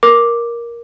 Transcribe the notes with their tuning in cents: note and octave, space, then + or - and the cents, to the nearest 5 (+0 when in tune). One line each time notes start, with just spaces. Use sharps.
A#4 +10 D6 +0